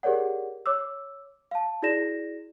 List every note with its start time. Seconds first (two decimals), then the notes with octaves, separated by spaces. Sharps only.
0.03 G4 G#4 A#4 C#5 D5 F#5
0.66 C#5 D6 E6
1.51 F5 A5
1.82 E4 F#4 G#4 D5 A#6 E7